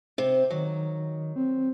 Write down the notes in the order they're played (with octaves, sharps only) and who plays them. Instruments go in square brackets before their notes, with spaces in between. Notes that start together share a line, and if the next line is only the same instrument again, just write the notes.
[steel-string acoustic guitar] C3
[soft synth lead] D#3 [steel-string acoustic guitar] F#3
[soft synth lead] C4